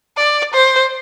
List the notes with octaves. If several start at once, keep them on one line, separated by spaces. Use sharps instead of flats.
D5
C5